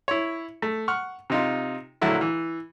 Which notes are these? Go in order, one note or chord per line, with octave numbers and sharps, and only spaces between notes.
E4 C#5
A3
F#5 C#6 F6
C3 D#4 F4
A#1 D3 F#3 A3 E4 E5
E3